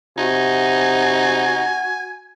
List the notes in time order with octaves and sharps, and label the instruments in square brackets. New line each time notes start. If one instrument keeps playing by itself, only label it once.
[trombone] C3 [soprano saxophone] D#4 [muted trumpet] F#4 [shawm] G#5